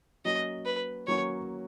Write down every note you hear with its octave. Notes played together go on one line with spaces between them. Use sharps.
F#3 A#3 C#4 F#4 D#5
B4
F#3 A#3 C#4 F#4 C#5